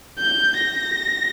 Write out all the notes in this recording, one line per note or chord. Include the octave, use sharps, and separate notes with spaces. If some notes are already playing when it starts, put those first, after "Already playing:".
G6
A#6